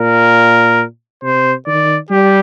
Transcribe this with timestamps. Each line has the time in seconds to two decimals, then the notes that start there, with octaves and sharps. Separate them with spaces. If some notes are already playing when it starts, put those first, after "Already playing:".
Already playing: A#2 A#4
1.23 C3 C5
1.67 D#3 D5
2.10 G3 G4